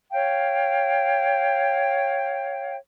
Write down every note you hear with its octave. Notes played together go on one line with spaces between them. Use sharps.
C#5 F5 G5